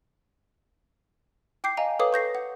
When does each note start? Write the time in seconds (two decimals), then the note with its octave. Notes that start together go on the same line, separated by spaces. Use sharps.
1.64 G5 D6 G6 C7
1.77 D#5 F5 G#5 A#5
1.99 A4 B4 C#5 F5 D6 D#6
2.13 C#6 G6 A#6 C7
2.35 F#5